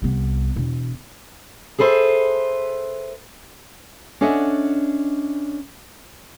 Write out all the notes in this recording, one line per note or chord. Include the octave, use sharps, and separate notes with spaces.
C2 B3
E1
G#4 A4 B4 C5 E5
C#4 D4 A4 D#5 E5 F#5